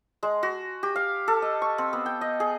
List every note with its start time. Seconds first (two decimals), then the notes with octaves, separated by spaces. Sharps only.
0.23 G#3
0.43 F#4
0.83 G4
0.96 F5
1.28 A4
1.42 D#5
1.62 C#6
1.78 C4
1.93 B3
2.06 G5
2.21 D#5
2.40 G#4